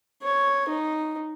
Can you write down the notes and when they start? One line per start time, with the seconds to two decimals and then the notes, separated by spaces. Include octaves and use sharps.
0.23 C#5
0.69 D#4